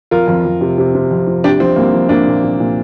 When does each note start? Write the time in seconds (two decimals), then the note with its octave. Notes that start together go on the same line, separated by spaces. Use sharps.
0.11 F2 F4 A#4
0.28 F2
0.45 F2
0.61 C3
0.78 C3
0.95 C3
1.11 F2
1.27 F3
1.44 C2 D4 G4
1.60 F3 C4
1.76 C2 A#3
1.93 F3
2.09 C2 A#3 D4
2.27 A#2
2.43 C2
2.60 A#2